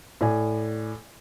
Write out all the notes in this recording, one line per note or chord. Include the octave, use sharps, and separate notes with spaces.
A2 D5 G#5